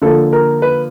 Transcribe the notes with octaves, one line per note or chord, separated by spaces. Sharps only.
D3 F3 A#3 A4
A#4
B4